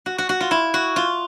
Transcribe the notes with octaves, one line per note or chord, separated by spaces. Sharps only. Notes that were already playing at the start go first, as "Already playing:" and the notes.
F#4
F#4
F#4
F4
E4
F#4
F4